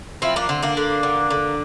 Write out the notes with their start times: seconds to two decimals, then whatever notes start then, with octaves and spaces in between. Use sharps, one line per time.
0.22 F3 C4 E4
0.36 A#3 D4
0.49 D3 C4
0.62 A#3 D4
0.77 D3
1.03 D3
1.30 D3